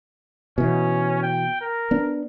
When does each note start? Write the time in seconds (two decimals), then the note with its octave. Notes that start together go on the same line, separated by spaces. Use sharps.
0.58 B2 E3 C#4
1.23 G5
1.61 A#4
1.91 B3 D4